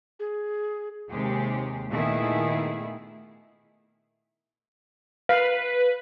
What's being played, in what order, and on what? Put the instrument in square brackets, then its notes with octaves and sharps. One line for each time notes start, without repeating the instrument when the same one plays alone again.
[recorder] G#4
[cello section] D#2 C3 G#3 G4 G#4
A#2 D#3 A3 B3 E4 G#4
[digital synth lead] B4 [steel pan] F5